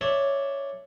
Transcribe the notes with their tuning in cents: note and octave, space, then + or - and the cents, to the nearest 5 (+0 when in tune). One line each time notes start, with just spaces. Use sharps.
D4 +0 C#5 +0 E5 +0